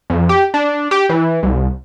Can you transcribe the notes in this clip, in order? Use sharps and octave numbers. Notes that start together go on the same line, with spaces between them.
F2
G4
D4
G4
E3
C2